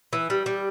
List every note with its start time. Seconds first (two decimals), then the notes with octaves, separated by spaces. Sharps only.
0.13 E3
0.30 G3
0.46 G3